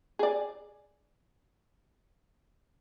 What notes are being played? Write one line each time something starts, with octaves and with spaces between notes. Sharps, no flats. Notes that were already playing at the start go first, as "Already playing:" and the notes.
G#4 D5